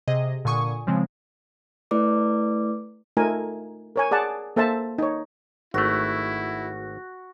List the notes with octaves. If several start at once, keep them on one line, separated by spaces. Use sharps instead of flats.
C3 G#4 D#5
A#2 D3 G#5 C#6 D#6
C#3 F3 G#3 C4
A3 E4 B4 D5 D6
A3 D#4 F4 A#4 G#5
A#4 C#5 G#5
G#4 D5 F#5 A5
A#3 A4 C5 E5 A5
D#4 C#5
G#1 A3 E4 F#4